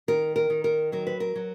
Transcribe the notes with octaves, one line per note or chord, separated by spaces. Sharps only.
D#3 A#4
A#4
D#3
A#4
F#3 A#4
B4
A#4
F#3